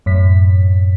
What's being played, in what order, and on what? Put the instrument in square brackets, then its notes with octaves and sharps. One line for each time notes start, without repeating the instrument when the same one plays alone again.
[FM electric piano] F#2 A2 B6